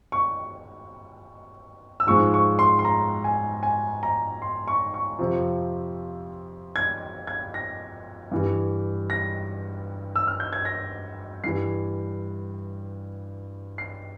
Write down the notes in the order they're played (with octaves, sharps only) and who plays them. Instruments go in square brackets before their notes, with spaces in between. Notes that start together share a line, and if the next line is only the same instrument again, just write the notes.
[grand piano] C#6
E6
G#2 F3 G#3 C#6
C#6
C6
C6
A#5
G#5
G#5
A#5
C6
C#6
C#6
F2 C3 F3
G#6
G#6
A#6
G2 E3 G3
A#6
E6
F6
G6
G#6
A#6
G2 E3 G3 C7
C7